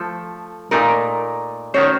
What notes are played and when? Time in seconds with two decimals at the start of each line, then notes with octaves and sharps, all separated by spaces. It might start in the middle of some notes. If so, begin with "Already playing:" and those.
Already playing: F3 A3 A4
0.71 A#2 A3 D#4 A#4
1.74 D#3 A3 C#4 F#4 C5 C#5